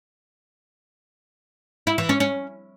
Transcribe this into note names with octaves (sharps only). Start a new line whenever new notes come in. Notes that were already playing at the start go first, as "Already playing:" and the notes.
E4
E3
C#4
C#4